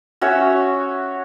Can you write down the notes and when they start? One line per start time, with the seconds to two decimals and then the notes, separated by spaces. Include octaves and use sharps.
0.21 C#4 F#4 C#5 E5